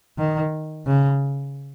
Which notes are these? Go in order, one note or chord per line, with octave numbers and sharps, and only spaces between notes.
D#3
C#3